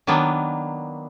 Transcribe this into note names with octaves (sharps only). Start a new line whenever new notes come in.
D#3 F#3 A#3 B3 D4